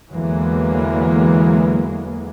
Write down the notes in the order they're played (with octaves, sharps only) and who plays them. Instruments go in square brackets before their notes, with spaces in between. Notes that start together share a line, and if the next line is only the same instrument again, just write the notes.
[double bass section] E2 D3 E3 F#3 G#3 A#3